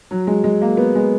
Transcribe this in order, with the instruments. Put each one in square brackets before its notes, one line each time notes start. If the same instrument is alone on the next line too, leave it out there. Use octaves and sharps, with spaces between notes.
[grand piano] F#3
G#3
G#3
A#3
B3
G#3